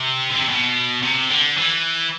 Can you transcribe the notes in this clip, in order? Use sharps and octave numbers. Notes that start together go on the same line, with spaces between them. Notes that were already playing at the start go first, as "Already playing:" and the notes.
Already playing: C3
D3
C3
B2
C3
D3
E3